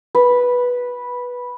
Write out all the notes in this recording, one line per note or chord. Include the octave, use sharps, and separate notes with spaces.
B4